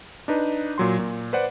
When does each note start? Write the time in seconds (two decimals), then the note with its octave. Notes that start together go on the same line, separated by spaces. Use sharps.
0.28 D4 D#4 B4
0.78 A#2 F#3 C6
0.99 A#2
1.33 B4 C5 D5 F#5